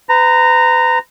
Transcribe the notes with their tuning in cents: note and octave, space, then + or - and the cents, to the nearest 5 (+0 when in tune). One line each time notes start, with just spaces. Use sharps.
B4 +35 A#5 -10